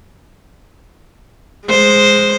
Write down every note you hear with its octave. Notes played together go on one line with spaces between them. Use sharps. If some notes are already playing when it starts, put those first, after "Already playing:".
G#3 C5